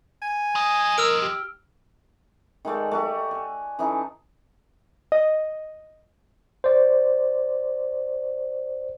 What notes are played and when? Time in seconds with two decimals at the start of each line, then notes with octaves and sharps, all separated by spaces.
0.22 G#5
0.55 F3 D#5
0.98 A#4 E6 F6 D7
1.22 G4
2.65 D#3 G#3 A3 D5
2.91 A3 F#4 G4
3.31 G#5
3.79 E3 C#4 D#4 A4
5.12 D#5
6.64 C5 D5